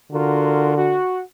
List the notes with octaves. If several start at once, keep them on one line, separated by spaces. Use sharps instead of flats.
D3 F4 F#4 A#4
F#4